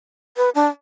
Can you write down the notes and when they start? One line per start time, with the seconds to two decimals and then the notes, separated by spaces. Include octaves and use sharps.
0.37 B4
0.55 D4